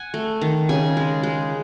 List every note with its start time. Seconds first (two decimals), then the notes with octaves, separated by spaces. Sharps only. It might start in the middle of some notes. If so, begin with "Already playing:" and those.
Already playing: F#5 G#5
0.14 A3
0.41 D#3
0.69 C#3 G#5
0.97 G#3
1.23 G#3